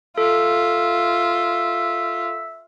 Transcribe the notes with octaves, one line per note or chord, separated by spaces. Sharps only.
F4 A4 E5